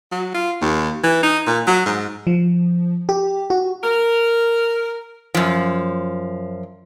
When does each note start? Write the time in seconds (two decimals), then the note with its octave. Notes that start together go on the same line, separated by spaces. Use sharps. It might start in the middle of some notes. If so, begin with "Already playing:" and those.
0.12 F#3
0.34 F4
0.62 D#2
1.04 E3
1.23 D#4
1.47 A#2
1.67 F#3
1.86 G#2
2.27 F3
3.09 G4
3.50 F#4
3.83 A#4
5.35 F#2 F3